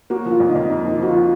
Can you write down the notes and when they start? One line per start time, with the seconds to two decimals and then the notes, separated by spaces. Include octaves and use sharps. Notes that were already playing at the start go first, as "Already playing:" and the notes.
0.10 A#3 F#4
0.26 F3
0.31 F4
0.40 F2
0.49 D#4
0.55 F2
0.69 A#3 D#4
0.85 F3 D#4
0.99 F3 F#4
1.09 F4